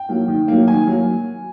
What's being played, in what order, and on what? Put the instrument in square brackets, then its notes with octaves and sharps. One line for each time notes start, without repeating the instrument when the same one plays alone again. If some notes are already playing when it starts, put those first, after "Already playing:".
Already playing: [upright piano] G5
F#3 A#3
D#3
F#3 A#3
D#3 G#5
F#3 A#3